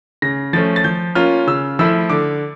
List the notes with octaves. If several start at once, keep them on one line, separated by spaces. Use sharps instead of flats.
C#3 A#6
F3 A3 C#4 A6
A6
F3 G6
A#3 C#4 F4 F6
C#3 E6
F3 A3 E4 E6
D3 D6